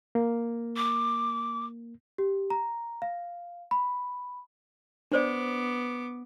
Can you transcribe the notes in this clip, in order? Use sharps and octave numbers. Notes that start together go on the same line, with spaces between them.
A#3
D6
G4
A#5
F5
B5
B3 D4 C5 D5 D6